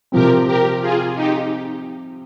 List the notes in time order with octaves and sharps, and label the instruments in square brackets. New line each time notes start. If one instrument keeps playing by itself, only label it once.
[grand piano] C3 F3 C4 [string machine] G4 A#4
[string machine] G4 A#4
F4 G#4
D#4 G4